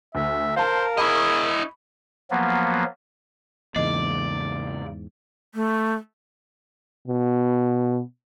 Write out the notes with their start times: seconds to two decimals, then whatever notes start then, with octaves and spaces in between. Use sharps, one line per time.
0.15 D2 E5
0.56 A#4 C5 F5 A5
0.97 E4 G#4 D#5 B5 C#6
2.31 F3 F#3 A#3 B3
3.76 E2 G#2 C#3 E3 A#3 D5 D#5
5.55 A3
7.08 B2